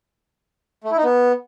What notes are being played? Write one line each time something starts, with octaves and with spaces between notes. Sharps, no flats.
A3
E4
D#4
B3